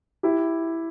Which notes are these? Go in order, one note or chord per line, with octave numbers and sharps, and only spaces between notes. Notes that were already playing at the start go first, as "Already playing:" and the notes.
E4 G4